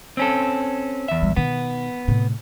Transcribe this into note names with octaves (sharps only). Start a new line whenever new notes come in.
C4 C#4 A4
E2 E5
A#1 G3
B2 D#3 B3
A2 C3